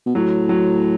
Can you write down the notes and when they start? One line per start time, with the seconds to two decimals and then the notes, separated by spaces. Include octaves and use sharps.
0.06 B2
0.15 A2 F#3
0.49 F#3